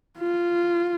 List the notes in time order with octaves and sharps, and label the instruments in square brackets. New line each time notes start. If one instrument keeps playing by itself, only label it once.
[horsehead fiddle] F4